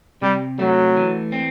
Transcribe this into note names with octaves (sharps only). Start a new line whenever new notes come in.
C3 G3
F#3 A3
E3
C4